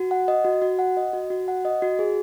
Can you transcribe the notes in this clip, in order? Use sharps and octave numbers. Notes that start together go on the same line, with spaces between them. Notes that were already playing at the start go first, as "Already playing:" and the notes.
Already playing: F#4
F#5
D#5
F#4
F#4
F#5
D#5
F#4
F#4
F#5
D#5
F#4
G#4